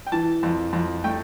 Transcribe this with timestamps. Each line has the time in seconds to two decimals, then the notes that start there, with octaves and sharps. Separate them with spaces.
0.07 G5
0.12 E3 A5
0.43 F2
0.73 F2
1.04 A3 G5